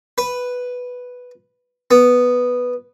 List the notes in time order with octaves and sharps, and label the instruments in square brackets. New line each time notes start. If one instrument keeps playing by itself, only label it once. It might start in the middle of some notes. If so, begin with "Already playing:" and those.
[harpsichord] B4
B3